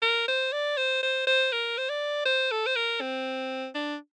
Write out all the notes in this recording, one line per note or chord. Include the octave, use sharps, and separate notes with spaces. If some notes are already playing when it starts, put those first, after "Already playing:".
A#4
C5
D5
C5
C5
C5
A#4
C5
D5
C5
A4
C5
A#4
C4
D4